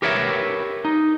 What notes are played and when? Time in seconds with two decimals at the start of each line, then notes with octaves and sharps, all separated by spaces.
0.02 G4 A#4 B4 C#5 E5
0.85 D#4